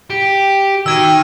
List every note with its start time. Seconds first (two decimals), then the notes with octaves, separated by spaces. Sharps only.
0.10 G4
0.86 D#3 F#4 G5 D6 E6 G#6 D#7